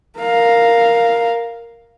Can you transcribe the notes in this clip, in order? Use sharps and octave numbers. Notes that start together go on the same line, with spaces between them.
A#4 F5